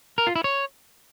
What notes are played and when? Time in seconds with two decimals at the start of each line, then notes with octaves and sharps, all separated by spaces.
0.18 A#4
0.27 F4
0.36 E4
0.44 C#5